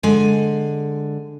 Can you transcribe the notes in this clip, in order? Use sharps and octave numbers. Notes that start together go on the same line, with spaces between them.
D3 G#3 G#5